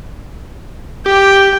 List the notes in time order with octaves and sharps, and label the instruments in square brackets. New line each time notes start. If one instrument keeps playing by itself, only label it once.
[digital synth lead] G4 [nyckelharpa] G5